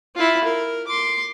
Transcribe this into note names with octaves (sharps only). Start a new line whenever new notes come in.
E4 F4
A#4
C6 D6